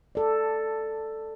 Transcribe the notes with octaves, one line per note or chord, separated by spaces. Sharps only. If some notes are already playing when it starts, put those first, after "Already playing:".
A4 D5